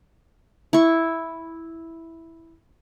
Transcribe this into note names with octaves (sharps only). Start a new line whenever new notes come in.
E4 C#6